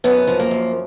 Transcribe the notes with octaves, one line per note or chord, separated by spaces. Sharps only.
F#2 B3
F3
A#3
F#2